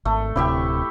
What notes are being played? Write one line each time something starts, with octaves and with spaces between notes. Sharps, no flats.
G#1 A3
D1 C3 E4 G4 E5